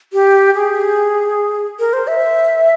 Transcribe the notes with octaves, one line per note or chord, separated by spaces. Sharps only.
G4
G#4
A#4
C5
E5